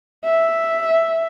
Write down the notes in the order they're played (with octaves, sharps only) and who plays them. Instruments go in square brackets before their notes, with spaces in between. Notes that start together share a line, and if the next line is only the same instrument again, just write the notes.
[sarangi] E5